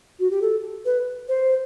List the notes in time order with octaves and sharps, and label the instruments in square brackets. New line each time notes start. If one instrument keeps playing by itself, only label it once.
[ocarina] F#4
G4
A4
B4
C5